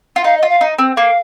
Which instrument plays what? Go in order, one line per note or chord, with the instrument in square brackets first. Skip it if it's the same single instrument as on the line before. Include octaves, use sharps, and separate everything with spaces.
[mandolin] F4
[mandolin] D#4 [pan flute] F5
[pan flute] D#5
[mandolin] F4
[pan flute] F5
[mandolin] D#4
C4
[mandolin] A#3 [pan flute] F5